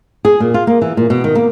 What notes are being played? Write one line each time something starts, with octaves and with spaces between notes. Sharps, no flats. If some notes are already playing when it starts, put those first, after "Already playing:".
G#4
A#2
F4
A#3
E3
A#2
B2
D#3
A#3